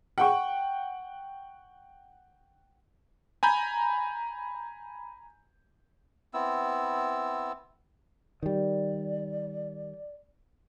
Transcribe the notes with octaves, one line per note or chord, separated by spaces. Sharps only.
F#5 G5 C#6
G#5 A#5 B5 G6
B3 C4 E4 E6
D#3 G3 D5